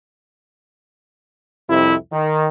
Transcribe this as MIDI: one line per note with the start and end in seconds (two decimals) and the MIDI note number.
1.69 1.95 36
1.69 1.95 41
1.69 1.95 48
1.69 1.95 64
2.12 2.48 51